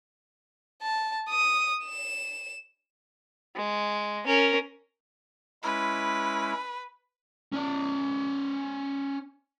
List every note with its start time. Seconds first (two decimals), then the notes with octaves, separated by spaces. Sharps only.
0.82 A5
1.30 D#6
1.86 E7
3.56 G#3
4.26 C#4 A#4
5.63 G#3 C#4 E4 B4
7.52 C#4 D5